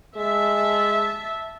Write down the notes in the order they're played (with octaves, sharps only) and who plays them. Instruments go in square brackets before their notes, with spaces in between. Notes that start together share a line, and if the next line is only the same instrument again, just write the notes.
[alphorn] G#3 [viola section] E5 A5